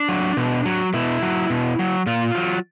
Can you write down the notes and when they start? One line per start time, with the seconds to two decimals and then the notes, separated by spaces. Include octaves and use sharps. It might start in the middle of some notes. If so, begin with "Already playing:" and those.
Already playing: D4
0.08 F#3
0.37 B2
0.65 F#3
0.93 B2 E4
1.22 F#3
1.50 B2
1.79 F#3
2.06 A#2 F4
2.35 F#3